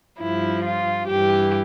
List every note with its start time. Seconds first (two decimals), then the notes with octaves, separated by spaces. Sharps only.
0.20 G2 F3 E4
0.64 F4
1.07 G2 E3 G4